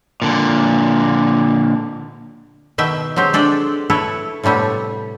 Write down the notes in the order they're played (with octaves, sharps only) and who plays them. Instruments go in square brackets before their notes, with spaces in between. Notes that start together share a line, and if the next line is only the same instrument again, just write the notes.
[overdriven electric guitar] A#2 D3
[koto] B2 D#3 E5 G5
F#3 G#3 C4 G4
G#3 D4 A4 D5 G5
E4 A4 B4 C#5
A2 C3 G3 A3 B3